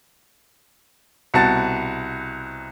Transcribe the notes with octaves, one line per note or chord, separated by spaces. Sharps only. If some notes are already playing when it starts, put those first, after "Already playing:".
C2 B2 F#4 A5 A6